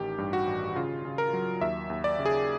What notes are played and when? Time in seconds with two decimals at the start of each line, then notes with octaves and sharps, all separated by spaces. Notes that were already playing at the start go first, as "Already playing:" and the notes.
Already playing: A1 D#3 G4
0.18 G2
0.33 F#4
0.47 A1
0.75 C#3 F4
1.05 C#3
1.18 A#4
1.33 F#3
1.61 D#2 E5
1.90 D#2
2.04 D5
2.19 C#3
2.26 G#4